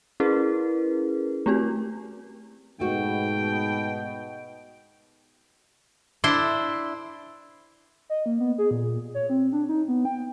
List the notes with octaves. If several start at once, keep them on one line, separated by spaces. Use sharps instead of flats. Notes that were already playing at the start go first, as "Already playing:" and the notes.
C#4 E4 G#4 A#4 B4
A3 C4 F#4 G4
G#2 B2 A3 F#4 G5
D4 E4 C5 C6
D#5
A#3
B3
G#4
A#2
C#5
C4
D4
D#4
B3
G5